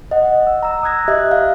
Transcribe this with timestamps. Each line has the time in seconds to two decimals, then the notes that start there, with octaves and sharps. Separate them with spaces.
0.11 D#5 F#5
0.47 E6
0.63 A#5 E6
0.83 D#6 F#6 G#6 A#6
1.08 G4 D#5 E5 F#6
1.31 F5